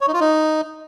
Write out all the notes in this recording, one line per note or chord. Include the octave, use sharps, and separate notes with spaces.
C#5
D#4
F4
D#4